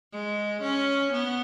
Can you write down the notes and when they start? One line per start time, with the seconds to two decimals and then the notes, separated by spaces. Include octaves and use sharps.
0.12 G#3
0.62 C#4
1.13 B3